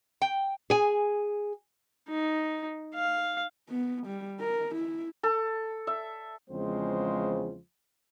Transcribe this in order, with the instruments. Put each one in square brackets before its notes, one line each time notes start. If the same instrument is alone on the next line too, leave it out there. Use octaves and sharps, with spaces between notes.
[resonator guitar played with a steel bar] G5
[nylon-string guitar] G#4 G#5
[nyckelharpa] D#4
F5
[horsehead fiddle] B3
G3
A#4
E4
[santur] A4
E5
[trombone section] E2 C#3 F3 G#3 C4 C5